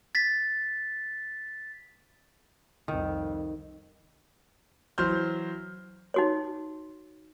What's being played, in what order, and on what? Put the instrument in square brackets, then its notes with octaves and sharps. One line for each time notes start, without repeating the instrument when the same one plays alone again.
[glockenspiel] A6 B6
[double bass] C2 F2 [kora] D#3
[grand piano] E3 F#3 C5 C6 F6 G6
[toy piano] D#4 F#4 C#5